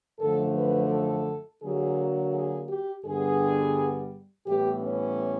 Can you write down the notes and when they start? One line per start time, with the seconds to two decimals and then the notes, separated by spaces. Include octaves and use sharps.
0.19 F#2 D3 F3 A3 A4
0.56 B4
0.91 A4
1.62 D3 F#3 A#3 G#4
2.33 G#4
2.69 G4
3.05 G2 D3 G3 B3 G#4
4.46 A2 E3 G3 B3 G4
4.83 C#4